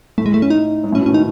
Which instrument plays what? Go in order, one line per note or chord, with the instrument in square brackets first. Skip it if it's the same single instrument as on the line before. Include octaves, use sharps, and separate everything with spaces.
[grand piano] A2 [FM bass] A3
[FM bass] G#3
A3
C#4
D#4
[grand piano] G#2
A2
[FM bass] C#4
[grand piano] B2
[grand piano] D#3 [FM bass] C#4
[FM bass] D#4